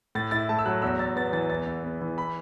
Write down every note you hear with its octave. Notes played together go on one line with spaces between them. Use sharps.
A2 A6
E4 A6
A3 A5
E6
F#3 F#6
E2 E6
E2 A6
B3 A6
E3 A6
E2 A6
E2
B3
E3
B5